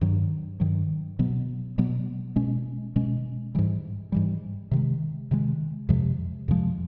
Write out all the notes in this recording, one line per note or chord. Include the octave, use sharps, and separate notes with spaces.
G2 D#3 F#3
G2 D#3 F#3
B2 F#3 B3
B2 F#3 B3
B2 G#3 C#4
B2 G#3 C#4
G#2 E3 G3
G#2 E3 G3
C3 D#3 G#3
C3 D#3 G#3
F2 C3 F3 G#3
F2 C3 F3 G#3